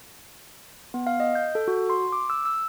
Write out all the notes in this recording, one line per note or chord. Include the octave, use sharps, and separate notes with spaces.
B3
F5
D#5
G6
A4
F#4
C6
D6
E6
E6